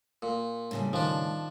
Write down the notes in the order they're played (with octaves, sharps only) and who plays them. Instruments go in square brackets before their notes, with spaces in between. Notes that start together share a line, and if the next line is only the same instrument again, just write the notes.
[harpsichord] A#2
[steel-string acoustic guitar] A2 C#3 G3
[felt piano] D#3 [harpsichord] F3 D4